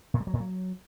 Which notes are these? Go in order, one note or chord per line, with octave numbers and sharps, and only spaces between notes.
A#2
G3
F#3
A#2
F#3